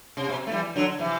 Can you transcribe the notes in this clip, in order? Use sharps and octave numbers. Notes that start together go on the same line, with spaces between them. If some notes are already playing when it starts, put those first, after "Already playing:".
C3
B2
A3
E3 G3
D3 F#3
C3 E3